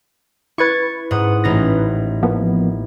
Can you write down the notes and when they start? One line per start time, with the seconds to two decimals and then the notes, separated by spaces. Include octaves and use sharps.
0.58 E4 B4 C#6 G#6 A6
1.11 G#2 F#5 D#6
1.44 A1 D#4 A#6
2.23 F3 A#3 B3